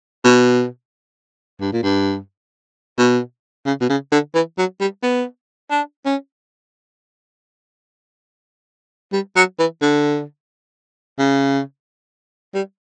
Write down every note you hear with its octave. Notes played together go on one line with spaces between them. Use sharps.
B2
G2
A#2
G2
B2
C#3
B2
C#3
D3
E3
F#3
G3
B3
D4
C#4
G3
F#3
E3
D3
C#3
G3